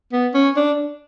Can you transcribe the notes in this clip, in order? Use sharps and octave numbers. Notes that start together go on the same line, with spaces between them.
B3
C#4
D4